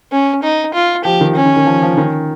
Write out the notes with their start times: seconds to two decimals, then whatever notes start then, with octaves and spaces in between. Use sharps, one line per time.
0.12 C#4
0.43 D#4
0.74 F4
1.04 F3 G4
1.21 D#3
1.35 C#4
1.45 D#3
1.56 D#3
1.66 F3
1.82 F3
1.98 D#3